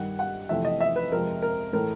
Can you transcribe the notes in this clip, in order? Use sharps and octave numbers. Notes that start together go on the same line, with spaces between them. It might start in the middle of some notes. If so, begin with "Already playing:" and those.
Already playing: G2 D#3 G3 F#5
F#5
F2 C3 E3 A3 C4 E5
D#5
E5
B4
F2 C3 F3 G#3 A#4
A#4
A2 E3 A3 A#4